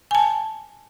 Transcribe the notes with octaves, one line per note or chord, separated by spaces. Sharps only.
G#5 A5